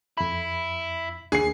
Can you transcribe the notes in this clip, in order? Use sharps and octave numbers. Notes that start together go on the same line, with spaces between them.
F2 E4 B5
D#2 A#3 D4 G#4 C7